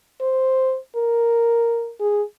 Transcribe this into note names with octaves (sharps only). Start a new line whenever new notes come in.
C5
A#4
G#4